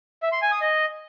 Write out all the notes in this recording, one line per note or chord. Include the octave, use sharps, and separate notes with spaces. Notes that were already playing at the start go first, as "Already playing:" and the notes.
E5
C6
G#5
D#6
D#5